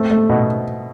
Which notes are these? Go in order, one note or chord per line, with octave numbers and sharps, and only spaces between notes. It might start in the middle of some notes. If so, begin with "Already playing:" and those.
Already playing: A3 C4
A3
B2